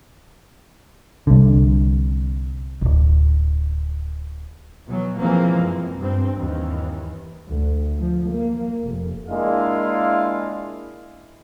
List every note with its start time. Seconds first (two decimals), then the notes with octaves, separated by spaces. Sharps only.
1.27 C2 D3
2.82 D1 G#1
4.87 B2 E3 F#3
5.17 E3 F3 G#3 A#3 C4
5.62 F#2
5.97 G2 C4
6.37 D#2 E3
7.48 D2
8.00 F3
8.32 A#3
8.83 F1
9.29 G#3 A#3 D4 E4 F4 F5